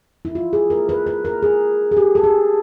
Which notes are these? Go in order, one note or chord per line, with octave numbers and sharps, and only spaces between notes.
E4
F4
G#4
A#4
B4
B4
A#4
G#4
G#4
G4
A4
G#4